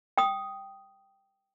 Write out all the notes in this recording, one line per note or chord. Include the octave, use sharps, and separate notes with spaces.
G5 D#6